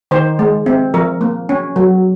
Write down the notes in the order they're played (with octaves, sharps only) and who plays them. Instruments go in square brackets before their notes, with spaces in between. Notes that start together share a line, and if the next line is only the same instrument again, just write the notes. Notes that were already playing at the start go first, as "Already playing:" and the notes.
[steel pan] D#3 C5
G#3
C4
F3 A#4
A#3
C#4
F#3